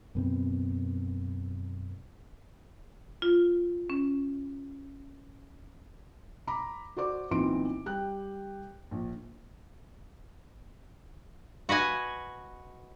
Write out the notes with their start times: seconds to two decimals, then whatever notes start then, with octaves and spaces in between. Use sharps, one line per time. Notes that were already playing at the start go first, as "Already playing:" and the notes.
0.15 F#2 B2 C4
3.22 F4
3.90 C#4
6.47 A#5 B5 D6
6.97 F#4 C5 D5 D6
7.31 B1 A#2 E3 C4 C6 D7
7.86 G3 G5 F#6
8.91 A#1
11.69 F#4 B4 D#5 G#5